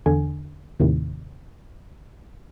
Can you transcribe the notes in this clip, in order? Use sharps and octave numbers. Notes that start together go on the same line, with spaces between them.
E2 D3 G#5
D#2 A2 C3 D#3